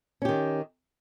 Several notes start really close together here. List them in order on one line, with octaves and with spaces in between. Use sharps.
C#4 G4 D#3